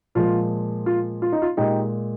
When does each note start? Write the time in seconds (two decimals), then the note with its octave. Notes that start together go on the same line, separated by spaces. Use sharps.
0.15 A#2 F3 G#3 F4
0.86 F4
1.22 F4
1.32 D#4
1.42 F4
1.57 A#2 G#3 D#4 G4